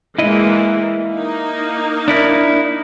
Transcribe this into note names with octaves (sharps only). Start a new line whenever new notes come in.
E3 G#3 A#3 E4 D#5
A#3 D#4
D4 E4 A#4